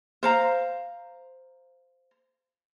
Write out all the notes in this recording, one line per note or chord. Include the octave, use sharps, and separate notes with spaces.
C5 F5 A#5